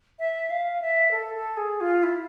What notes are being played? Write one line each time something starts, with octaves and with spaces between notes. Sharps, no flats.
E5
F5
E5
A4
A4
G#4
F4
E4